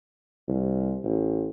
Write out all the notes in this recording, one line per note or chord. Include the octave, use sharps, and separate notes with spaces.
C2
A1